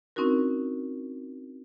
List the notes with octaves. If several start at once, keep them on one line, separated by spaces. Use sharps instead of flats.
C4 C#4 D#4 E4 F#4 A#4